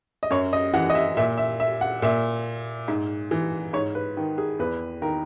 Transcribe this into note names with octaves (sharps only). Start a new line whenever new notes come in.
D#5
F#2 C#5
D#5
E3 F#5
D#5
E5
A#2 E5
E5
E5
F#5
A#2 E5
G#2
E3
G#2 C#5
B4
D#3
G#4
E2 B4
D#3 A#4